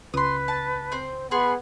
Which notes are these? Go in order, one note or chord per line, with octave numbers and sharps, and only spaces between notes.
C#2 B4 C6 D#6
A5
C4 C5
B3 G#4 F#5 B5 C6